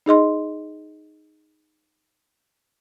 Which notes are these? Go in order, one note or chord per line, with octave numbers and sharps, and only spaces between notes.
D#4 G#4 D#5 C6